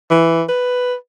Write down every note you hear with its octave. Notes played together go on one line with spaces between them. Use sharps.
E3
B4